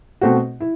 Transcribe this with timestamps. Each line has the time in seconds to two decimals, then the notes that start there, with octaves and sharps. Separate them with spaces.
0.21 B2 A3 C4 F#4
0.61 E4